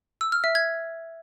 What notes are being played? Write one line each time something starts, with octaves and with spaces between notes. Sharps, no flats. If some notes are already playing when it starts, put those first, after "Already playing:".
E6
F6
E5
G#6